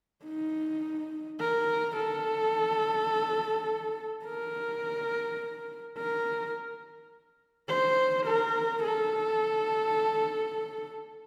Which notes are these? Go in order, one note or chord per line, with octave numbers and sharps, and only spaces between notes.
D#4
A#4
A4
A#4
A#4
C5
A#4
A4